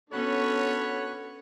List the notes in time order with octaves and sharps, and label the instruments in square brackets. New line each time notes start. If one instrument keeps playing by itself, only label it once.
[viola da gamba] B3 C#4 [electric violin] D4 A4 [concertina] F#4 B5 F#6 [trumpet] C#5